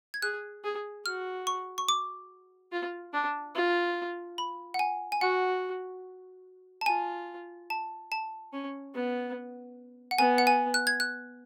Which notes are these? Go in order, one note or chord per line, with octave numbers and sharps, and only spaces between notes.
G#6
G#4 F#6
G#4
F#4 F6
C#6
C#6
D6
F4
D4
F4
B5
F#5
G#5
G#5
F#4 F#5
A5
F4 G#5
A5
A5
C#4
B3
F#5
B3 G#5
F#5
G#5
F#6
G#6
F#6